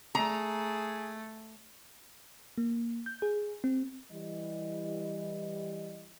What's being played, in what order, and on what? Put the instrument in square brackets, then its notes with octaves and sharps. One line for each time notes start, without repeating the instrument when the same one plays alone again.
[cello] A3 [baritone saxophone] G#4 [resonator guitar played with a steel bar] A#5
[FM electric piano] A#3
G6
G#4
C4
[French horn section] E3 G3 D#5